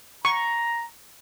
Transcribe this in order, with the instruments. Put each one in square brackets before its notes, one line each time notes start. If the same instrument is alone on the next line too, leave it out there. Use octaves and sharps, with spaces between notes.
[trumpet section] A#5 [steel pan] C#6